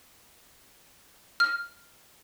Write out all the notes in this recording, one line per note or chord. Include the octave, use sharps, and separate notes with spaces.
F6